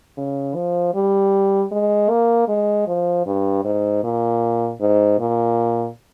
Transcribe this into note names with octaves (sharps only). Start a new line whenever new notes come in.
C#3
F3
G3
G#3
A#3
G#3
F3
G2
G#2
A#2
G#2
A#2